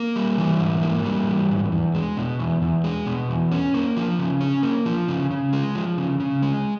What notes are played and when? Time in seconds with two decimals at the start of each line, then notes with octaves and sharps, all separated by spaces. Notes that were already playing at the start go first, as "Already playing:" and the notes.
Already playing: A#3
0.16 G3
0.38 E3
0.60 G#2
0.83 A#3
1.05 G3
1.27 E3
1.50 G#2
1.72 E2
1.94 G#3
2.17 B2
2.39 E2
2.62 E2
2.84 G#3
3.06 B2
3.29 E2
3.52 C#4
3.74 A#3
3.97 F3
4.19 C#3
4.41 C#4
4.63 A#3
4.86 F3
5.08 C#3
5.31 C#3
5.53 G#3
5.75 F3
5.98 C#3
6.20 C#3
6.42 G#3